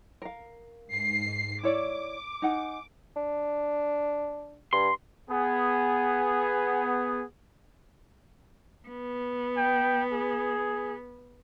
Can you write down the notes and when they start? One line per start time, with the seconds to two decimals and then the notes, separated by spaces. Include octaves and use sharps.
0.22 A#4 F5
0.93 G#2 C7
1.63 E4 C#5 D5 D6
2.42 D#4 F#5 G#5
3.16 D4
4.73 G2 C6
5.29 B3 G#4
8.88 B3
9.57 G5
10.13 G#4